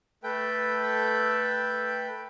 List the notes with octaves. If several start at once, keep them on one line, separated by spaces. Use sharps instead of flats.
A3 A4 B4 G5